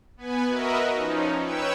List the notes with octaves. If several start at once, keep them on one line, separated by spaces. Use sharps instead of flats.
B3 B4 G#5
F#4 A#4 B4 D#5 E5
F3 C#4 D#4
B4 C#5 G5 E6